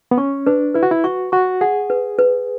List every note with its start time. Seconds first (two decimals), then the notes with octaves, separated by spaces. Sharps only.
0.11 B3
0.18 C#4 C#6
0.46 D4 B4
0.75 E4 B4
0.83 F#4
0.91 E4
1.04 F#4 C#6
1.32 F#4 C#6
1.61 G#4 F#5
1.90 B4
2.19 B4